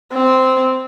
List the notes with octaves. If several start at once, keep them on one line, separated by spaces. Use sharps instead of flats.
C4